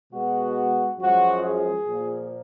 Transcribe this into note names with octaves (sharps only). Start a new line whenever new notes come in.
B2 G#3 B3 F#4
F#2 F3 G#3 F#4
G#4
A#2 F3 A#3